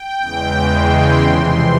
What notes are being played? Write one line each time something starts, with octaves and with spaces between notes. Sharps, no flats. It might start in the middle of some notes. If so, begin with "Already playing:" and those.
Already playing: G5
E2 C#3 E3 G#3
C6
F2 C3 E3 C6